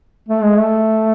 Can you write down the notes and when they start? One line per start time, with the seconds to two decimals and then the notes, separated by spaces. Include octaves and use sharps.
0.29 A3
0.42 G#3
0.56 A3